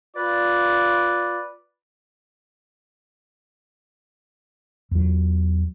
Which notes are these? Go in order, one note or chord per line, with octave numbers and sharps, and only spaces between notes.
F4 B4 D5
E2 F#3